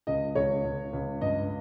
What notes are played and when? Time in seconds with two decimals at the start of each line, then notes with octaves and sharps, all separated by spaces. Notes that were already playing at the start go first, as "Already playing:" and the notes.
0.07 C#2 D#5
0.35 C#2 C#5
0.64 C#2
0.93 C#2
1.21 G2 D#5